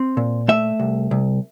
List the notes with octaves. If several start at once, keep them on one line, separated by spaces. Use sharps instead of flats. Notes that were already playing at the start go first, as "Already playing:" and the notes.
Already playing: C4
A#2
A3 E5
C2
C2